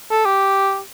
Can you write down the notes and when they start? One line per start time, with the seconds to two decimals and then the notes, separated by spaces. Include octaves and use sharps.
0.11 A4
0.25 G4